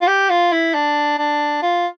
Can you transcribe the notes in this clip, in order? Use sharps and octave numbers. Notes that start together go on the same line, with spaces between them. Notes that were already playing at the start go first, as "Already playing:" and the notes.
F4
G4
F4
E4
D4
D4
F4